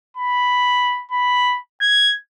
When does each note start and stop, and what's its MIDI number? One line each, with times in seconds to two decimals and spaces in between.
0.17 1.03 83
1.12 1.58 83
1.81 2.15 92